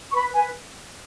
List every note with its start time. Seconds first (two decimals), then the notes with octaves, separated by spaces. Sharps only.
0.11 C#6
0.16 B4 B5
0.33 B4 G#5